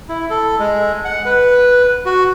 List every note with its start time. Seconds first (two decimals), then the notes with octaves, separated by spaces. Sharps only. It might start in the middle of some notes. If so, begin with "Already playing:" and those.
0.09 E4
0.30 A4
0.59 G#3
1.05 F#5
1.25 B4
2.06 F#4